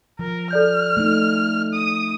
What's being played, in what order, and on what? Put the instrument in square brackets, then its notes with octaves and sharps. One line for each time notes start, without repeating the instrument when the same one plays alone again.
[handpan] F3 [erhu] A#4
[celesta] A4 D5 G6 [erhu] F6
[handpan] A3 D#4
[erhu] D#6